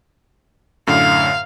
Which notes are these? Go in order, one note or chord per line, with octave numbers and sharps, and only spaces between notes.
F#2 A2 D3 F5